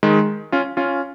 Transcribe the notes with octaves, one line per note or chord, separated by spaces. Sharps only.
D#3 G#3
C#4 F4
C#4 F4